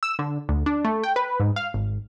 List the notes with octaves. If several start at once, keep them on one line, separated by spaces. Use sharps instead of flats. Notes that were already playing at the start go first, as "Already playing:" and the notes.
E6
D3
D2
D4
A3
G5
B4
G#2
F5
G#1